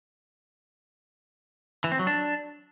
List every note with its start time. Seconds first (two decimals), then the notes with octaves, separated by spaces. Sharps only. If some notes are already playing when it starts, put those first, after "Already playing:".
1.84 E3
1.92 C4
1.99 F#3
2.07 D4